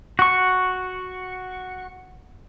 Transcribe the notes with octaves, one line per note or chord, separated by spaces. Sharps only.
F#4 C#6